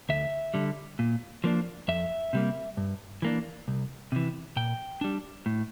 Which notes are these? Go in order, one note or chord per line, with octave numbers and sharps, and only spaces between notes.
D2 E5
D3 G3
A#2
F3 A#3 D4
F2 E5
C3 G3 A#3
G2
E3 A#3 D4
C2
C3 E3
A#2 G5
G3 D4
A2